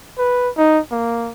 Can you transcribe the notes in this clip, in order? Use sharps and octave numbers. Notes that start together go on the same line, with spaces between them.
B4
D#4
A#3